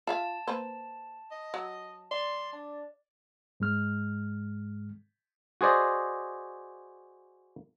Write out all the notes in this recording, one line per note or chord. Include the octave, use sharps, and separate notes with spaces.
F4 E5 F5 A5
A#3 B4 C5
D#5
F#3
D5 C6
D4
G#2 G#3 F6
F#4 G#4 C5 D5 D#5